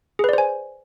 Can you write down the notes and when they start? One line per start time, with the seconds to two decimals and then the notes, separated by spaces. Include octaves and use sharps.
0.19 G#4
0.24 B4
0.29 D5
0.33 C5
0.38 G#5